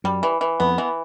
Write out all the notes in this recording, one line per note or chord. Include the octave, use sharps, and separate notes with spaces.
F#2 G3
E3
E3
F2 B3
E3